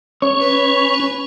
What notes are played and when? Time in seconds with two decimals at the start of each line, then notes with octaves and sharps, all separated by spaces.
0.22 C#4 C#5
0.39 B4